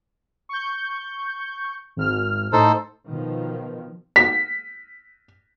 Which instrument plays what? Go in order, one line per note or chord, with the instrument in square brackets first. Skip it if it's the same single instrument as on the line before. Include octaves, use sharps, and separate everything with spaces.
[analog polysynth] C#6 G6
G#1 F6
[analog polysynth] A2 [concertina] D#4 A4 C5
[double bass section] B2 D#3 F3
[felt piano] B6